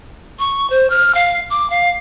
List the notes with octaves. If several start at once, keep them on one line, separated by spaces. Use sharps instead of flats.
C#6
C5
F6
F5
D6
F5